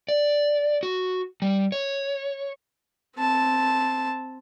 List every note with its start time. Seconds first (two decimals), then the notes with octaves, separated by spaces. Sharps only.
0.09 D5
0.83 F#4
1.42 G3
1.72 C#5
3.17 C4 A5